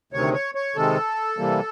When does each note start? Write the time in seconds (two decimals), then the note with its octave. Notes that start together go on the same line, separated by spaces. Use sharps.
0.13 D2 C3 D#3 C#5
0.34 C#5
0.55 C#5
0.76 C3 D#3 G#3 A4
1.38 C3 E3 G3 A#3